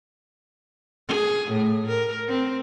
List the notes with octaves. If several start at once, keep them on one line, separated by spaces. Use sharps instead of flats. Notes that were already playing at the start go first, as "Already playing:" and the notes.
G#4
A2
A#4
C4